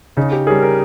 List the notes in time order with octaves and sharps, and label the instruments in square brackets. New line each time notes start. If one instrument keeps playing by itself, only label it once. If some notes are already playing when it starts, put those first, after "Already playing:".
[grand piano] C#3 [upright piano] D#4
[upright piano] G4
[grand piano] G3 C#4 G#4 [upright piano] A#4
[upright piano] A#4